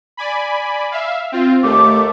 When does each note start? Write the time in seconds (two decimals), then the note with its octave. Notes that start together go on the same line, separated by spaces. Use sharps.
0.17 D5 G#5 B5
0.92 E5 F5
1.32 C4 F4
1.64 D#2 A3 D6